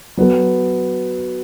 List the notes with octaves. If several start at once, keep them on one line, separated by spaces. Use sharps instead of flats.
F#3 B3 F#4 A4